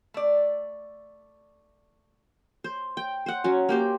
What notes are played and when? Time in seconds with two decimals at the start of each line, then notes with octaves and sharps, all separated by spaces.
0.14 A3 D5
2.64 C5
2.97 G5
3.26 C5 F#5
3.44 F#3 C#4
3.69 A#3 G4 C5